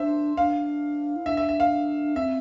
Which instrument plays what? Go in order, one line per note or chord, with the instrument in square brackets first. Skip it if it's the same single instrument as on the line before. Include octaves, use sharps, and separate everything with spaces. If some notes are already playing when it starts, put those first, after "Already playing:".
Already playing: [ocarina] D4 [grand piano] C5 E5
[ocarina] D4 [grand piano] F5
[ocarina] E4
[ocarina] D4 [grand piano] E5
[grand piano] E5
E5
F5
[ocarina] C4 [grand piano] E5